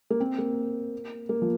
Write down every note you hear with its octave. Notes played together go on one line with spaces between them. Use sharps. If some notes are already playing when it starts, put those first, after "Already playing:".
A#3
C4
A#3
A#3
F3